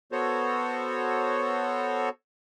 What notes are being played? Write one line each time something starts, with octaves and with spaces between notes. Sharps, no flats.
B3 F#4 A4 C5 C#5